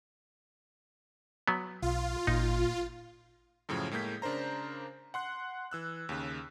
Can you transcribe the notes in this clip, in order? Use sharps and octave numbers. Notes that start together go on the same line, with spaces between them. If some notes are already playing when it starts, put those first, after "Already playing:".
F#3 B3
B1 F4
G#1 A#2 D#4
F#2 A2 C#3 F3
A2 G#3 A#3 G6 B6
C#3 D4 A#4 C5 A#5
F#5 C6 F#6
E3 E6 F#6
D#2 C#3